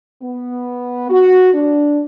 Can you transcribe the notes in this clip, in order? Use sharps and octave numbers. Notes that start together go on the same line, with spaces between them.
B3
F#4
D4